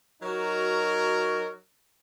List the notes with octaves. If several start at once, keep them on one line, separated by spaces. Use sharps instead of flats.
F#3 D#4 F#4 A#4